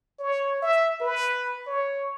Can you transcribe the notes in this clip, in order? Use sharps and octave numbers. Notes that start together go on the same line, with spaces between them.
C#5
E5
B4
C#5